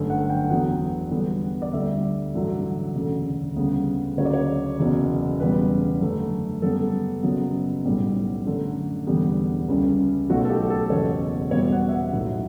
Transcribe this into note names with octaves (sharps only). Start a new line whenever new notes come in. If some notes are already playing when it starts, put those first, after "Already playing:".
Already playing: G1 F#2 D3 A3
F#5
G5
E2 D3 F#3 B3 F#5
E2 D3 G3 B3
D5
D2 D3 G3 E5
A1 G2 D3 F#3
E1 D2 C#3
D2 C#3 G3 B3
D2 C#3 F#3 C#5
D5
C#5
F#1 E2 B2 F#3 B3
E1 E2 C#3 G3 B3 B4
F#2 D3 A3
F#2 C#3 G3 B3 A4
F#1 F#2 C#3 F#3 B3
B1 A2 G3 B3
F#2 D3 A3
E1 E2 D3 G3 B3 G4
C#2 C#3 G3
B1 B2 A3 F#4
A4
G4
A4
F#1 E2 B2 C#5
E2 B2 G3 B3 C#5
F#5
E5
F#5
B1 A2 F#3 E5